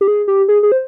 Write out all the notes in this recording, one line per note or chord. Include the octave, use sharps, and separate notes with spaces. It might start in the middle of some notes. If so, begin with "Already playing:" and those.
G4
G#4
G4
G#4
G#4
C5